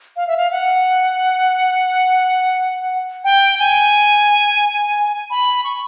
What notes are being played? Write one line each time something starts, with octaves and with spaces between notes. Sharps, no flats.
F5
E5
F5
F#5
G5
G#5
B5
C#6